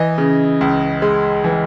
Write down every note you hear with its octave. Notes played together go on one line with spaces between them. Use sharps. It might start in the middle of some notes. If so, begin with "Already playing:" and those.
Already playing: E3 D#5
C#3
C#2
G#3
E3